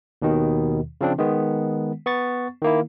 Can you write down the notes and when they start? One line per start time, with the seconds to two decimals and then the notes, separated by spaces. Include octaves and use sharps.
0.22 D#2 B2 D#3
1.01 C#3 F3 C4 D4
1.18 D#3 G#3 B3
2.06 B3 C#6 A6
2.62 D#3 A#3 E4